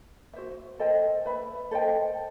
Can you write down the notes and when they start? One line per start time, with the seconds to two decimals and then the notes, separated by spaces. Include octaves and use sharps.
0.33 F#4 C5 E5
0.79 A4 C5 D#5 G5
1.25 B4 E5 B5
1.71 A4 C5 D#5 G5